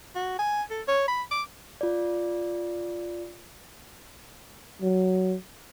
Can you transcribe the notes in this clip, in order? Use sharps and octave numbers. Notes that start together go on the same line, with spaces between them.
F#4
G#5
A4
C#5
B5
D6
F4 D5
F#3